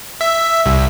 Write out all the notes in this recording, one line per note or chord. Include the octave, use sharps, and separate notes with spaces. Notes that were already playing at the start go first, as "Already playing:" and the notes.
E5
C2